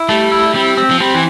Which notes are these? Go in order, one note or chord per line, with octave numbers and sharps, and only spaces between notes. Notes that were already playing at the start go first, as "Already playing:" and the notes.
Already playing: E4
G3 A3
E4
G3 C4
C4
F3
G3 C4
E3